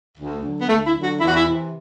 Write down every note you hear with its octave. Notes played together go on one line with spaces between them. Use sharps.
D2
D3 F#3
B3
D2 A3
E4
D3 F#3
F#4
E2 E4
F#4
E4
C3 E3